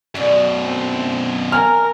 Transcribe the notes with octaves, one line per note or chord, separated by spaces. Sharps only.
F#2 B2 D3 D5
C4
G#3 A#4 G#5 F6